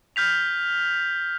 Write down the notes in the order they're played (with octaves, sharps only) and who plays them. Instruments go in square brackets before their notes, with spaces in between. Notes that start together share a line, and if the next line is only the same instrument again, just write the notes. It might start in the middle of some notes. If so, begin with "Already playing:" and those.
[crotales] F6 G6 B6 F7